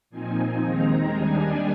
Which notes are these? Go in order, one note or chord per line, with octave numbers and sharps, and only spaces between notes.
A#2 F3 C4 D#4 G#5
D#2 D#3 G#3 C4 D#4 A#5
D#2 D#3 G3 D4 G#5